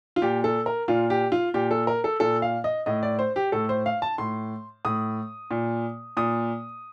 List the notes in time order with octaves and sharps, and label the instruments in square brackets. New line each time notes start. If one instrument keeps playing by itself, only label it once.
[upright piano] F4
A#2 G4
A4
A#4
A#2 F4
G4
F4
A#2 G4
A4
A#4
A4
A#2 A4
F5
D#5
A2 D#5
D5
C5
G4
A2 A4
C5
F5
A5
A2 C6
A2 D#6
A#2
A#2 D#6